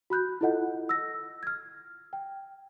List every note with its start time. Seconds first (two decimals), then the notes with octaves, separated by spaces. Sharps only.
0.10 F#4 B5 F#6 G6
0.41 E4 F4 A4 D#5 F#5
0.89 E6 A#6
1.43 F6 G#6
2.13 G5